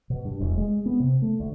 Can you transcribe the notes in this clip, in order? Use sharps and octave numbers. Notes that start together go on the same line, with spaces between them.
B2
G2
E1
G#3
B3
C3
A3
D2